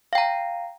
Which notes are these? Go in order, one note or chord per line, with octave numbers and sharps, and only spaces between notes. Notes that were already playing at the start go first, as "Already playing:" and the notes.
F5 G5 A#5